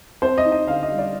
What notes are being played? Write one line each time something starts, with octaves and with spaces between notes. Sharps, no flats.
C4 C5
D#5
D#4
D#5
D3 F5
D#5
G3
D5